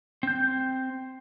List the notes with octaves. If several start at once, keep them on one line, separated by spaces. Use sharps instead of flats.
C4 G6